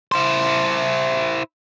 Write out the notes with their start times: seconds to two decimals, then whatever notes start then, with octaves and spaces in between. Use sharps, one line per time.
0.12 E4 C5